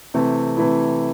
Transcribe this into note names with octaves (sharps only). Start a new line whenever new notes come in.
C3 E3 A3 C4
C3 E3 A3 E4